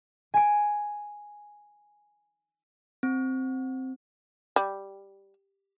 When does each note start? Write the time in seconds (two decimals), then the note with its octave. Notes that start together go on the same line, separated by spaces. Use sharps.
0.34 G#5 D7
3.03 C4
4.56 G3